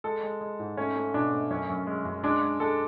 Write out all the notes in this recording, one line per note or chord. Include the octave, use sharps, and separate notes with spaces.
G#3 A4
G#3
G#3
G#2
A3 C#4
A3
B2 D4
A3
F#2 C#4
F#2
G#3
F#2
G#3 D4
G#3
G#3 A4